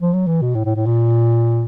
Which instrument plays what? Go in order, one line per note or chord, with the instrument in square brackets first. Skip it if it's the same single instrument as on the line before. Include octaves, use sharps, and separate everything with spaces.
[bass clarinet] F3
F#3
E3
B2
A2
A2
A2
A#2